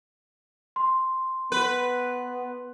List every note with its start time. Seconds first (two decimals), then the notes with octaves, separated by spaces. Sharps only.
0.76 C6
1.52 B3 B4